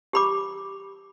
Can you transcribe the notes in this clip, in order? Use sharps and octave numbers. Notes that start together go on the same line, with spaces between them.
G4 B5 D6